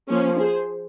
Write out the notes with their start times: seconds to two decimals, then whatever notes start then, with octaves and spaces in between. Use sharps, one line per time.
0.08 F3 A#3 C#4
0.38 G#4 C5